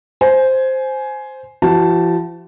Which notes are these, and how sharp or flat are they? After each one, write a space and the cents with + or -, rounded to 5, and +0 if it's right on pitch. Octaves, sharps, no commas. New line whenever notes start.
C5 +0 G#5 +15
F3 -45 F#4 +40 A5 +0